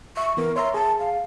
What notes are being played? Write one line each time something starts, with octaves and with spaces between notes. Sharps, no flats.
E5 C#6
E3 B3 A#4
C#5 E5 A#5 C6
G#4 A5
F5